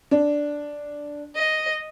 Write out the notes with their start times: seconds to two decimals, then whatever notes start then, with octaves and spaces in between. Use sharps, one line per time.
0.11 D4
1.36 D#5